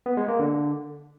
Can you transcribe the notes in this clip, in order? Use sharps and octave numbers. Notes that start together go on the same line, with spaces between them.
B3
G#3
A#3
D3